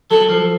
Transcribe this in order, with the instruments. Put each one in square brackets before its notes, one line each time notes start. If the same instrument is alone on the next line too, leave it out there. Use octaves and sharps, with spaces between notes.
[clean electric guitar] F#3 [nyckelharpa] A4
[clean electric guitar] F3